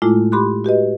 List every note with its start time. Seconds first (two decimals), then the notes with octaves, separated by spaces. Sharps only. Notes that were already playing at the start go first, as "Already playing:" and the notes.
0.02 A2 G#3 A3 E4 F4 D6
0.32 G4 B5 C6 D6 F#6
0.64 F#4 G4 B4 D#5